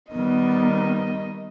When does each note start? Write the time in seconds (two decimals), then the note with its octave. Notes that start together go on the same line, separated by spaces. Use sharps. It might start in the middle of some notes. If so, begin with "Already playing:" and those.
0.12 D#3 G3 B3 D#5